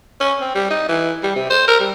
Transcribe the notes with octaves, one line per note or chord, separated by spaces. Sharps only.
C#4
C4
G3
D#4
E3
G3
C3
C5
A#4
G3